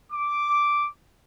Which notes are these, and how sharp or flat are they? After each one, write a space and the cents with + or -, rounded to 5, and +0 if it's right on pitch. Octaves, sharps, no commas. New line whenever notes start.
D6 -5